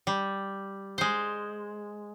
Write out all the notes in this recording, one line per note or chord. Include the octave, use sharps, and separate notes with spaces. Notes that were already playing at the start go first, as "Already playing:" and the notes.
G3
G#3 C5